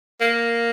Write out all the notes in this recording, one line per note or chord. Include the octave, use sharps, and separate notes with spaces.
A#3